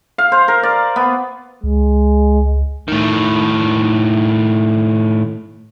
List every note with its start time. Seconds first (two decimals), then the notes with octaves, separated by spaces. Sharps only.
0.18 F5
0.32 C5
0.48 A#4
0.63 D5
0.96 B3
1.64 C#2 G#3
2.88 A2 D#3